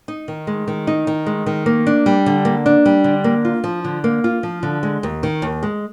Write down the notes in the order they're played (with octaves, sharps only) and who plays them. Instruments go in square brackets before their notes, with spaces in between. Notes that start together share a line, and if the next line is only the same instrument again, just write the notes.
[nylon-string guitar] D#4
D#3
G#3
D#3
D#4
D#3
G#3
D#3
A#3
D4
G3
D3
A#3
D4
G3
D3
A#3
F4
F3
D3
A#3
F4
F3
D3
G#3
D#2
D#3
D#2
G#3